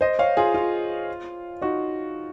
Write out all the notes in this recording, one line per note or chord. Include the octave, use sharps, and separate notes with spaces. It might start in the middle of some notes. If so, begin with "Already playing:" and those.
C5 D#5
C#5 F5
F4 G#4
F4
D#4 F#4